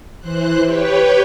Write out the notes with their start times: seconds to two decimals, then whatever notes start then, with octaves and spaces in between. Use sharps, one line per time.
0.19 E3 C5 F#6
0.64 G4 B4 C#5 G5